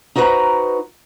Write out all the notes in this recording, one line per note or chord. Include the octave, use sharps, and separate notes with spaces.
D#4 F#4 B4 C5 F5 A#5